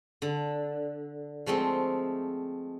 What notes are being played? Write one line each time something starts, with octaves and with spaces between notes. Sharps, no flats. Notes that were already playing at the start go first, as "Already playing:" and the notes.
D3
F3 G#3 A3 C4